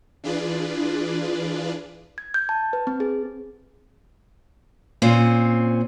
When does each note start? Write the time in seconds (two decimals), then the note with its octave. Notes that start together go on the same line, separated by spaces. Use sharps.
0.24 E3 D4 F4 G#4 B4 D5
2.18 G#6
2.34 G6
2.49 A5
2.73 B4
2.87 C4
3.00 G#4
5.02 A#2 C4 C#4